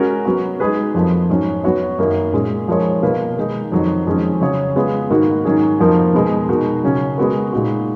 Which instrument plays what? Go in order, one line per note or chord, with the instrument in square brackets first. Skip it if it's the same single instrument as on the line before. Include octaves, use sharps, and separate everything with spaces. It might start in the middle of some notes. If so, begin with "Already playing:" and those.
Already playing: [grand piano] G#3 C#4 F#4 A#4
F#3 B3 F#4
G#3 D#4 G#4 B4
F2 F3 A#3
G#2 F#3 C#4 F#4 C#5
F#3 B3 F#4 C#5
F#2 D#3 A#3 D#4 A#4
A#2 G#3 C#4
F3 G#3 D#4 A#4 C#5
B2 A#3 F4 B4
D#3 G#3 D#4
F2 D#3 F#3
F2 D#3 G#3 C#4
C#3 F#3 C#4 G#4 C#5
G#3 B3 F4 G#4
G#2 D#3 A#3 D#4 F#4
G#2 D#3 F#3 C#4 G#4
F2 F3 A#3 D#4 A#4
B2 G#3 B3
B2 G#3 D#4 F#4 A#4
C#3 F#3 C#4
G#3 B3 F#4 A#4
A#2 G#3 D#4 F#4